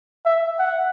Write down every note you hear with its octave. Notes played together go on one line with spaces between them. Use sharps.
E5
F#5